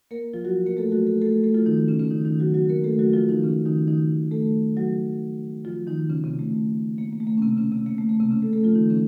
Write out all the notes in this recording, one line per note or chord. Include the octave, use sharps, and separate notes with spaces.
A#3 A#4
F3 F4
F#3 F#4
A#3 A#4
A3 A4
F#3 F#4
A3 A4
A3 A4
A3 A4
F3 F4
D#3 D#4
C#3 C#4
C#3 C#4
D#3 D#4
D#3 D#4
F#3 F#4
F#3 F#4
A#3 A#4
A3 A4
F#3 F#4
F3 F4
D#3 D#4
C#3 C#4
D#3 D#4
D#3 D#4
A3 A4
F#3 F#4
F3 F4
D#3 D#4
C#3 C#4
C3 C4
A3
A#3
A#3
A3
A#3
C#4
C3 C4
C#3 C#4
C3 C4
A#3
A3
A#3
C3 C4
C#3 C#4
A3 A4
A3 A4
F3 F4
D#3 D#4
C#3 C#4